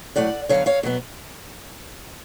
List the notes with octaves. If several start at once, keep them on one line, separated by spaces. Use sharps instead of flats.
A2 F#3 A3 D5 F#5
D3 F#3 B3 C#5 F5
C#5 F5
B2 F#3 B3